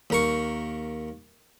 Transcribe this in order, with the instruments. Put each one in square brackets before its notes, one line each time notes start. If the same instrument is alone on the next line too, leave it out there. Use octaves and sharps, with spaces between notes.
[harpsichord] D#2 A#4 C#6